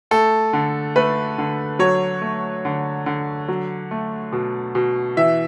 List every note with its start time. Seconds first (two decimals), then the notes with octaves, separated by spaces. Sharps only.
0.11 A3 A4
0.53 D3
0.95 A3 B4
1.38 D3
1.79 F#3 C#5
2.22 A3
2.65 D3
3.06 D3
3.48 F#3
3.91 A3
4.32 B2
4.75 B2
5.17 E3 E5